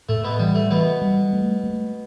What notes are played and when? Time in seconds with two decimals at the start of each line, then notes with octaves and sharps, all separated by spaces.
0.09 A2 A3
0.24 B2 B3
0.39 E3 G3
0.55 A3
0.71 B2 E3 B3
1.02 G3
1.33 A3
1.64 A3